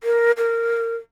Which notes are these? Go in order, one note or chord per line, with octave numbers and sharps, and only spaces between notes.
A#4
A#4